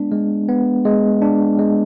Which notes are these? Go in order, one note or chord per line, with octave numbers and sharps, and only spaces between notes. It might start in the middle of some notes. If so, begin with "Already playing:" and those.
Already playing: G#3 B3 D4
G#3
B3
G#3
D4
G#3